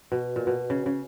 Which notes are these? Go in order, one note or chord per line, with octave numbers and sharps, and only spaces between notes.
B2
A#2
B2
C#3
C#3